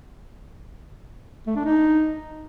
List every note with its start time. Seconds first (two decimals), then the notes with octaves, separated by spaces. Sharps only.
1.47 A3
1.56 D4
1.65 D#4